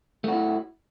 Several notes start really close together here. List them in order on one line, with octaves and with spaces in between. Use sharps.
A3 F#4 E4